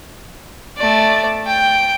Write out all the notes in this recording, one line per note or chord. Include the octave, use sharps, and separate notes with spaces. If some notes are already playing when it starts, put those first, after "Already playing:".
A3 D5
G5